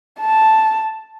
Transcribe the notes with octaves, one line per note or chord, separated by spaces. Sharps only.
A5